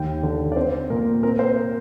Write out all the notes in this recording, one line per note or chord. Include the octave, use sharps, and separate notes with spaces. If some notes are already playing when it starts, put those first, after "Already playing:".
Already playing: D#2 G5
D3
D5
C4 C5
A#2 A#4
C4 A#4
C5
A#4